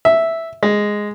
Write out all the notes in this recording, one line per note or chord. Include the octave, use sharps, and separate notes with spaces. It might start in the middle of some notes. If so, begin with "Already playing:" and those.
E5
G#3